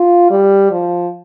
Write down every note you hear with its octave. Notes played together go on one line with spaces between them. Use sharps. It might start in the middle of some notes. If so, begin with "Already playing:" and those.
Already playing: F4
G3
F3